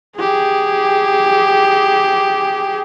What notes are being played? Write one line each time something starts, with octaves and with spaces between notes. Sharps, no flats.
G4 G#4